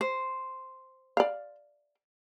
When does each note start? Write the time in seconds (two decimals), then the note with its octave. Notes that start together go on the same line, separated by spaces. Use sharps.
0.01 C5
1.17 D5 F5